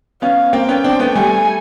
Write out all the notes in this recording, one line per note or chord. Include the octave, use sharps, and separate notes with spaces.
B3 C#4 F5
A#3 C4 G5
B3 C#4
C4 D4
A3 B3
G3 A3 G#5